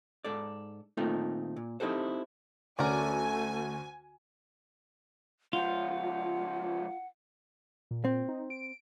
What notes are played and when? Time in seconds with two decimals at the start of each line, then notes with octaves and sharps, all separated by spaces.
0.24 G#2 A4 D5
0.97 A#2 D#3 A3 C4 D#4 F4
1.56 A#2
1.80 C4 D#4 E4 G4 A4 C5
2.79 D2 A3 C#4 F#4 A#4 D5 G#5
5.53 C#2 F3 F4 F#5
7.91 A#2
8.05 C4
8.29 D#4
8.50 D7